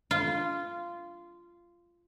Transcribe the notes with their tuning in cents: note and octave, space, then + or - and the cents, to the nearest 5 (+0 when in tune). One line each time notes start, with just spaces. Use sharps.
F4 -15